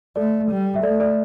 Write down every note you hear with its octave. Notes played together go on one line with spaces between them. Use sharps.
A3 A4 D5
G3
E5
A3 A4 D5
A4 D5